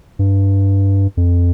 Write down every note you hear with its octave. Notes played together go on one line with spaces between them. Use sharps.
G2
F2